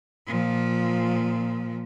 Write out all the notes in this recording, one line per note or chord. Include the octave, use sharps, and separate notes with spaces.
A#2 F3